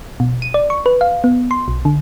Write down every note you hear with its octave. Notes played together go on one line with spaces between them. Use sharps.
B2
D#7
D5
C#6
B4
F5
B3
C6
B1
D3